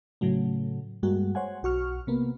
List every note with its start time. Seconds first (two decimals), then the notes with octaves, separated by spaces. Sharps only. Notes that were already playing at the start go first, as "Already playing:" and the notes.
0.21 A2 C#3 F#3 A3
1.03 G2 G3 G#3 A#3 F#4
1.35 C5 C#5 F#5 G#5
1.63 B1 F#4 C#6 F6
2.07 C3 A#3 B3